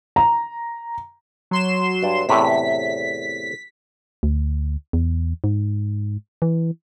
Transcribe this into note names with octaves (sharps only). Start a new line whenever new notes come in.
A#5
F#3 C6 E7
G2 D5
E2 A2 C3 B6
D2
E2
G#2
E3